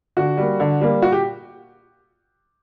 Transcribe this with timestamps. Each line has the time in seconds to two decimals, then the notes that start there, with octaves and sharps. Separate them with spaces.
0.17 D3 F#4
0.37 G3 A#3
0.60 D3
0.81 G3 A#3
1.02 A#2 F#4
1.12 G4